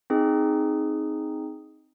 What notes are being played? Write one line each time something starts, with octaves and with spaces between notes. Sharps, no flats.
C4 D#4 G#4